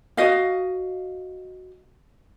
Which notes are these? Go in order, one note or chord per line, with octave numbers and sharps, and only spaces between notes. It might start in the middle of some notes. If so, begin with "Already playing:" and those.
F#4 D#5 F5